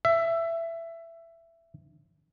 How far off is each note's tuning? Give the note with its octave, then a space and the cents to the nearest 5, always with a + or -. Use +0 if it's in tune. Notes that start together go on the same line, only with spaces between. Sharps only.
E5 +15